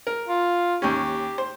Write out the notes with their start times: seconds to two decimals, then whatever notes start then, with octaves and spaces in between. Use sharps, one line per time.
0.07 A#4
0.28 F4
0.82 D#2 C#4 G4
1.38 C5